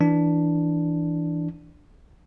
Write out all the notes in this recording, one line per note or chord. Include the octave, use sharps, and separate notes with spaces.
E3 D4